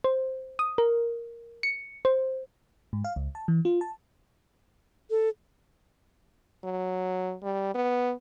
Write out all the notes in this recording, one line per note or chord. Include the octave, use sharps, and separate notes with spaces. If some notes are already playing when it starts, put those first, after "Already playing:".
C5
D#6
A#4
C#7
C5
G#2
F5
C#2
A5
E3
F4
A5
A4
F#3
G3
B3